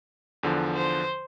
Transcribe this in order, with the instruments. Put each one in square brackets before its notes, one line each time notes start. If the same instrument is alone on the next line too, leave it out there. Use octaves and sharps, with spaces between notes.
[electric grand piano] E2 D3 F3
[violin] C5